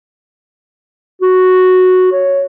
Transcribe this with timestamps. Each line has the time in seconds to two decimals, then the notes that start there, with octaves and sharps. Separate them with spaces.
1.22 F#4
2.12 C#5